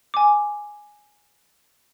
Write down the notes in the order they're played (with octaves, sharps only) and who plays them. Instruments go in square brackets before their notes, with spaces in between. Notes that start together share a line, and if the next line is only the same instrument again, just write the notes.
[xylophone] G#5 D6